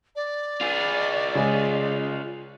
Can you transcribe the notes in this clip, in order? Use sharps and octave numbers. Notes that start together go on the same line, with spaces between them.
D5
F4 G#4
C#3 G#3